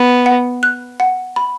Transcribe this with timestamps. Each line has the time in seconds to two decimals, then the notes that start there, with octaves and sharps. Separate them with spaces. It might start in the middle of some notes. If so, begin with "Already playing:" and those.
Already playing: B3
0.26 F#5
0.63 F#6
1.00 F#5
1.36 B5